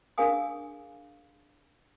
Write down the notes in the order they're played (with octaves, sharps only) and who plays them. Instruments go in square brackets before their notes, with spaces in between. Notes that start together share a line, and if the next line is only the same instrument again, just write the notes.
[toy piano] D4 G#4 A#4 F5 G#5 D#6